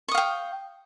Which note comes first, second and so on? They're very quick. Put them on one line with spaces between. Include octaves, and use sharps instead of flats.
C#6 D#6 F5 G5